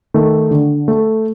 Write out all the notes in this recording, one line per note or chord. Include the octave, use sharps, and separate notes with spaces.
D#3 A3
D3
A3